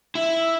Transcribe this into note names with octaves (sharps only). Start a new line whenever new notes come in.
E4